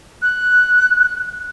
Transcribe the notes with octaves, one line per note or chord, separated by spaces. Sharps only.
F#6